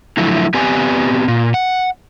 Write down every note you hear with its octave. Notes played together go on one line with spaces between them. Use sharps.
D3 F3 F#3 A3 E4
B3 C4 G4 B4 D5 G#5
A#2
F#5